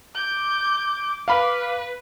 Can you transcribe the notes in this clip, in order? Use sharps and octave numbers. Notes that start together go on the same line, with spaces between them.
D6 G6
B4 F5 B5